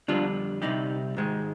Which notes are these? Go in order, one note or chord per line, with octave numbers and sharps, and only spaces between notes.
F2 D3 G3 D4 F4
C2 C3 G3 D#4 G4
G#2 D#3 G#3